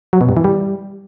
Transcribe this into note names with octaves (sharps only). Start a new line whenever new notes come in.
F#3
B2
G2
E3
G3